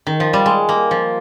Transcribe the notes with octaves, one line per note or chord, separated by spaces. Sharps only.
D#3
F3
G3
G#3
A#3
F3